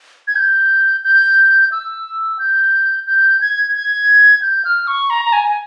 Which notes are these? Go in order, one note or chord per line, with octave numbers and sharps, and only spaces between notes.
G#6
G6
G6
E6
G6
G6
G#6
G#6
G6
F6
C#6
A#5
A#5
G#5
G#5